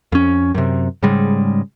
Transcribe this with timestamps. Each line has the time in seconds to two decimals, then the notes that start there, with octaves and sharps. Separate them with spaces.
0.12 F2 C#4
0.54 F#2 C3
1.03 G#2 C#3 G3 G#3